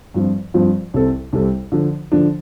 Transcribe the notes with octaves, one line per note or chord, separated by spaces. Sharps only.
G2 F3 C4 F4
G2 F3 C4 F4
C2 C3 G3 C4 A4
C2 C3 G3 C4 A4
D3 F3 D4
D3 F3 D4